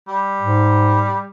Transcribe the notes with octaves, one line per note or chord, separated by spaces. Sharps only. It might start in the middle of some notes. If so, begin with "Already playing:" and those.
G3
G#2